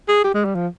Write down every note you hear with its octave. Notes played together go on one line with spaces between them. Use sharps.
G#4
G4
G#3
G3
F3